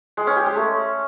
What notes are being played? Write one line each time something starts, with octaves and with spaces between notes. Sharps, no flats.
G#3
C#4
G4
G#3
A3